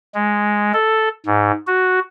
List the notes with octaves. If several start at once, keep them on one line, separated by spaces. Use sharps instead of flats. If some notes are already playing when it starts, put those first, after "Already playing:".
G#3
A4
G#2
F#4